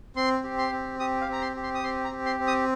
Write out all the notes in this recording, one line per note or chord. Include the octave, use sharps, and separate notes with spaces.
C4 C6
G4
C6
C4
G4 D#6
F5
C4 A#5
C6
G4
C6
D#6
C4 C6
A#5
G4
C6
C4
D#6